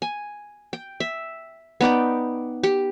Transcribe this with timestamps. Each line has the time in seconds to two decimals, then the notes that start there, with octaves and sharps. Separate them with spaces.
0.02 G#5
0.73 G5
1.00 E5
1.81 B3 D#4 D5 G5
2.63 G4